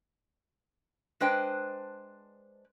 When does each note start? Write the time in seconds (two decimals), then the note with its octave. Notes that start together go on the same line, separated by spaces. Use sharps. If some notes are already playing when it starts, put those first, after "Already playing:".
1.20 G#3 D4 B4 C5 D#5 G5